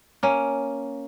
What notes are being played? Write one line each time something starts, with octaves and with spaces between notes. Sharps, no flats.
A#3 C#4